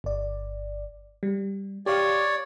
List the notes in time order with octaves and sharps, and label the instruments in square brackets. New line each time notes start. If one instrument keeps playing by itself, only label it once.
[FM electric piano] G1 D5
G3
[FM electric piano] G4 F5 [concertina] C#5 D5